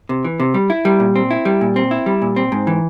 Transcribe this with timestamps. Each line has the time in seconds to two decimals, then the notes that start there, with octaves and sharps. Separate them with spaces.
0.09 C3
0.25 E3
0.40 C3
0.54 G3
0.70 E4
0.85 G3
1.00 A#2
1.16 C4
1.31 E4
1.45 G3
1.61 A#2
1.76 C4
1.91 E4
2.06 G3
2.22 A#2
2.36 C4
2.52 G#2
2.67 E3